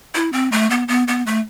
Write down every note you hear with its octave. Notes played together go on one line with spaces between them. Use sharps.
E4
C4
A3
B3
B3
B3
A3